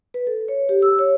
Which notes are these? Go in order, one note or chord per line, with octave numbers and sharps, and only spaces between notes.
B4
A4
C#5
G4
E6
C#5